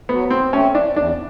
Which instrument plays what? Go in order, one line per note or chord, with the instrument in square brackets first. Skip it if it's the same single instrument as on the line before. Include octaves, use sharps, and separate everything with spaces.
[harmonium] F#3 [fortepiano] B3
[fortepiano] C4
[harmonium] A3 C4 [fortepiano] C#4
[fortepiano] D4
[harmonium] E2 [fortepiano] D4